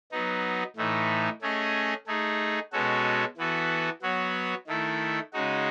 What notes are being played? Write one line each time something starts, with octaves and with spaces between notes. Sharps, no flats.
F#3 B3 D#4
A2 E3 A3 D#4
A3 C#4 G#4 D#5
A3 D#4 G#4
B2 G#3 C#4 F#4 A4
E3 B3 F#4 A4
F#3 B3 F#4 C#5
D#3 A3 E4 A4
C#3 G#3 D#4 F#4